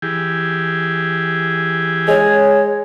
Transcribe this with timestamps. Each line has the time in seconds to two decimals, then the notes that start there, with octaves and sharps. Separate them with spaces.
0.02 E3 G4 G#4
2.08 G#3 C#5